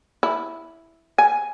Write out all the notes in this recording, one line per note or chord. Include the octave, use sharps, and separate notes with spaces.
E4
G#5